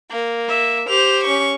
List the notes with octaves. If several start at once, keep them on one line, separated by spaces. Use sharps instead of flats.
A#3
E5
G4 C5 F7
C#4 C#6